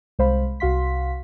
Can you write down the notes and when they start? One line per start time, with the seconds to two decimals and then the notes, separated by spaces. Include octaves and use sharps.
0.19 C2 G#3 C5 F5 B5
0.60 C2 F#4 F5 C6 B6